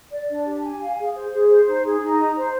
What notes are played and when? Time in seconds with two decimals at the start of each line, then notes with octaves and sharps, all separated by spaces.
0.10 D5
0.28 D4
0.45 G4
0.62 G#5
0.80 F5
0.98 G#4
1.15 C5
1.32 G#4
1.50 C5
1.67 D#4
1.84 G#4
2.02 D#4
2.19 A#5
2.36 C5